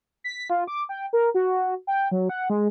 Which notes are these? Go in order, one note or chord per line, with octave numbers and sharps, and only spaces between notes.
B6
F4
D6
G5
A#4
F#4
G5
F#3
F#5
G#3